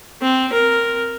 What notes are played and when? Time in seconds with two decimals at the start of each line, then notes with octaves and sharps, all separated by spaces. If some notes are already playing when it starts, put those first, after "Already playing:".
0.22 C4
0.52 A#4